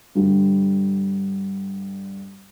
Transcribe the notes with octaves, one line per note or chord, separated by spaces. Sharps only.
G2 D3 G3